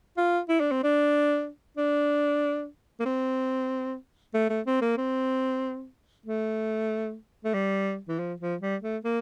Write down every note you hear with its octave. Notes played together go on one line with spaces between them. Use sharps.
F4
E4
D4
C4
D4
D4
A#3
C4
A3
A3
C4
A#3
C4
A3
A3
G3
E3
F3
F3
G3
A3
A#3